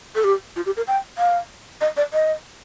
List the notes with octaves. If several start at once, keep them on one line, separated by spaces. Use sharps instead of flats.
A4
G4
F4
G4
A#4
G5
F5
D#5
D5
D#5